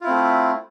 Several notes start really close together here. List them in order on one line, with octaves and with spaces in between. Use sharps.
F4 E4 C4 A3